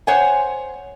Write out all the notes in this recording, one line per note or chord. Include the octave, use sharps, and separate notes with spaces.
C5 C#5 F#5 G#5